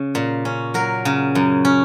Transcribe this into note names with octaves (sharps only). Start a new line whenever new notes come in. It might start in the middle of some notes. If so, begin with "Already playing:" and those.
Already playing: C#3
A#2
C#4
F#3 A#4
C#3
F#2
C#4